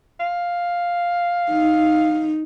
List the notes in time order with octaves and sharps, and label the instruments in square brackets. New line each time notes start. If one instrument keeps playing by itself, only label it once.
[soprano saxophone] F5
[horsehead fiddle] D#4